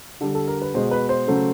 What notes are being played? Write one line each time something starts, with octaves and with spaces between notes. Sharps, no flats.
D3 G3 A4
A4
A#4
B4
B2 G#3 C5
B4
C5
C#3 F#3 A3